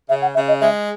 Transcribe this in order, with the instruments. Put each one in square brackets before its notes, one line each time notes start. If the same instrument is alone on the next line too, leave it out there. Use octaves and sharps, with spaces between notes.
[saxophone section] C#3 [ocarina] E5
[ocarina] F#5
[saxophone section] C#3 [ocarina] E5
[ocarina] D#5
[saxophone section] G#3 [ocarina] E5